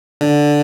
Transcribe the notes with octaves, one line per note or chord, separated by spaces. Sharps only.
D3